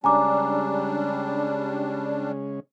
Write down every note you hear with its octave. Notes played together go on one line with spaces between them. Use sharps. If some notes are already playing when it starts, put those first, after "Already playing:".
C#3 G3 G#3 C#4 D4 G#5 A#5 D6